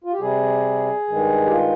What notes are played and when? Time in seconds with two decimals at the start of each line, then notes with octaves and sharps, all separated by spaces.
0.04 F4
0.12 G4
0.20 C3 G3 G#4
1.08 G2 D#3 G#3
1.45 G4
1.50 F4